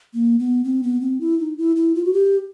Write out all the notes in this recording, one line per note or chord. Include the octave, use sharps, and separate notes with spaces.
A#3
B3
C4
B3
C4
E4
D#4
E4
E4
F4
F#4
G4